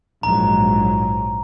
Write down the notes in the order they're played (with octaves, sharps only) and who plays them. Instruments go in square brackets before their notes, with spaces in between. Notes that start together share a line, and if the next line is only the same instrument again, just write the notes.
[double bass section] A#1 G#2 F#3 [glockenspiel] A#5